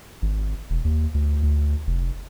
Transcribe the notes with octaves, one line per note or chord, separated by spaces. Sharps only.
G#1
E1
D#2
D2
D2
F1